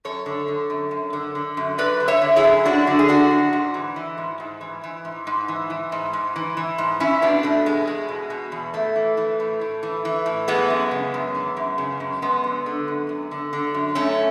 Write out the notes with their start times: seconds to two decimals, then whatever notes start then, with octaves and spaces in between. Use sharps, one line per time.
0.05 F#2 A4 C#5
0.26 D3
0.48 D3
0.70 F#2
0.91 F#2
1.13 D3
1.35 D3
1.57 F#2
1.78 F#2 B4 D5
2.00 D3
2.08 C#5 E5
2.21 D3
2.36 E4 G#4
2.44 F#2
2.65 F#2 D4 F#4
2.87 D3
2.99 G#4
3.08 D3 D4 F#4
3.31 F#2
3.53 G#2
3.74 E3
3.96 E3
4.18 G#2
4.40 G#2
4.61 E3
4.83 E3
5.05 G#2
5.27 G#2
5.48 E3
5.70 E3
5.92 G#2
6.13 G#2
6.36 E3
6.57 E3
6.78 G#2
7.00 E2 C#4 E4
7.22 B2 B3 D4
7.43 B2 A3
7.66 E2 G#3
7.87 E2 G#3
8.08 B2
8.30 B2
8.52 E2
8.74 A2 A3
8.96 E3
9.17 E3
9.40 A2
9.61 A2
9.83 E3
10.05 E3
10.26 A2
10.48 E3 G#3 B3
10.70 F#2
10.91 C#3
11.14 F#2
11.35 E3
11.57 F#2
11.78 C#3
12.00 F#2
12.22 F#2 G#3 B3
12.44 D3
12.66 D3
12.88 F#2
13.09 F#2
13.31 D3
13.53 D3
13.74 F#2
13.95 F#2 A3 C#4